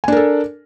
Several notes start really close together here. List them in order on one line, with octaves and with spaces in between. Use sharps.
G#5 D4 A#4 A4